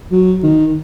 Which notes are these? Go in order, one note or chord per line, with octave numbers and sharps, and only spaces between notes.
F#3
D#3